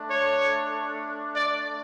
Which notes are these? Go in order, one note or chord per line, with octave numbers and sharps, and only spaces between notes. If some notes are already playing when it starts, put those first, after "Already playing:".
Already playing: A3 D4
C#5
D5